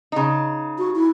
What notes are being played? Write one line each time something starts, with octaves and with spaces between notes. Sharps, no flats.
C#3 D#4
F#4
E4